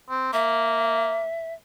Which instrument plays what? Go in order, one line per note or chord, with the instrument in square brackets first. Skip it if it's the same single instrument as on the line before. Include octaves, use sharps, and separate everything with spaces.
[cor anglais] C4
[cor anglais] A#3 [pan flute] E5